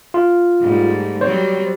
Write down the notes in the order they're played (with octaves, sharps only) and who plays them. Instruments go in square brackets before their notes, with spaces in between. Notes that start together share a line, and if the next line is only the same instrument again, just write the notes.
[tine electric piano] F4
[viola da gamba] G#2 G3 A3
[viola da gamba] F#3 G3 C4 [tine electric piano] C5 C#5